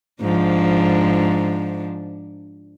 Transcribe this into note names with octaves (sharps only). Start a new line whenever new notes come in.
G#2 F3 D4